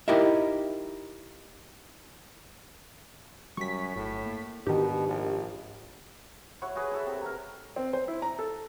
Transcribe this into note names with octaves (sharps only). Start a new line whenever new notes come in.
D#4 E4 G4 A#4 D#5 E5
F#2 F#3 G3 C#6 B6
G1 A2
A#3
G#2 B2 D#3 D4 G4
A#1
E4 F#4 C#5 F#5
F#4 G#4 B4
E4 A4 E5
C3
A#4 A#5
C4
C5
E4
A#5
A4